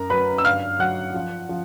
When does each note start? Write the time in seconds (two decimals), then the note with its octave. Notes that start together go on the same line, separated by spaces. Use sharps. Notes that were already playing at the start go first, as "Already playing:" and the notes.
Already playing: F#2 A#4 A#5
0.10 F#3 B4 B5
0.38 E6
0.45 G2 F5 F6
0.79 F#3 F#5 F#6
1.14 F3
1.49 F3